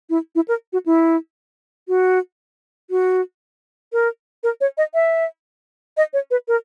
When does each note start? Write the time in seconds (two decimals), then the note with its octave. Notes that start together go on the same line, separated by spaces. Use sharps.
0.10 E4
0.35 E4
0.48 A#4
0.73 F#4
0.86 E4
1.88 F#4
2.90 F#4
3.93 A#4
4.43 A#4
4.61 C#5
4.78 D#5
4.94 E5
5.97 D#5
6.13 C#5
6.31 B4
6.48 A#4